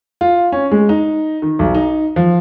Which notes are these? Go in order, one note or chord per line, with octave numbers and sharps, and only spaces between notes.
F4
C#4
G#3
D#4
D#3
B1
D#4
F3